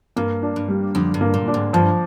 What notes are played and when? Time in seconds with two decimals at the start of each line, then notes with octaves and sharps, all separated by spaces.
0.16 G2 A#3
0.43 D4
0.56 G2
0.69 G3
0.95 F2 D3
1.14 G2
1.21 A#3
1.34 A#2
1.48 D4
1.54 G#2
1.73 G2 F3